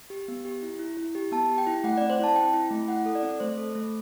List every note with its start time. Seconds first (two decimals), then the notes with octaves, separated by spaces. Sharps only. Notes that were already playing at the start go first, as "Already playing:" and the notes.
0.10 G4
0.28 B3
0.45 G4
0.63 E4
0.79 E4
0.97 E4
1.15 G4
1.32 B3 A5
1.50 G4
1.58 G5
1.67 E4
1.84 A3 F#5
1.97 D5
2.02 C4
2.10 C5
2.20 E4 A5
2.36 C4 G5
2.53 E4
2.71 A3
2.88 E4 F#5
3.06 A4
3.15 D5
3.23 C4
3.40 A3 C5
3.58 A4
3.75 A3